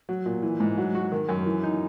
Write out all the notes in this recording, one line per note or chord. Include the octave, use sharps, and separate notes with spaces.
F#3
A#2
E3
G#2
F#3
F#4
D#3
F#2
E3
D#4